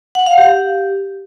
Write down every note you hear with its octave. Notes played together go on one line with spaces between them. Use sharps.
F#5
F5
G4